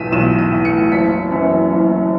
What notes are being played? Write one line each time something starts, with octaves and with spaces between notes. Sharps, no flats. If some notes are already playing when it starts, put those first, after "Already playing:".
Already playing: B1 A2 E3 B6 D#7 E7
B1 E7
D#7
A2 E3
C#7
F#1 B6
F#2 E3
F#1